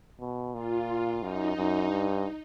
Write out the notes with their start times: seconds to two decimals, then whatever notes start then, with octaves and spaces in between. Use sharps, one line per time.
0.20 B2
0.54 A#2 F4
1.21 F#2 D#4
1.56 F#2
1.90 G2